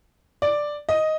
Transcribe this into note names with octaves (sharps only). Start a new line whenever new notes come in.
D5
D#5